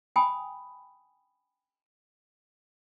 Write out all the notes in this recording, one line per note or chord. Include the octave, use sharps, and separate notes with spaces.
G5 G#5 B5 D#6